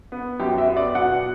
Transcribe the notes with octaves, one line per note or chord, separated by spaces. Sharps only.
B3
F#2 G4
E5
B3
D5
B2 F#5